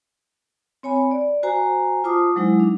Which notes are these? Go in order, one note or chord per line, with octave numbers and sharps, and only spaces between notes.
C4 C#5 G#5 B5
D5
F#4 C5 G#5 A#5
F4 C5 A5 D6 D#6
F#3 G#3 D#4 E4
D4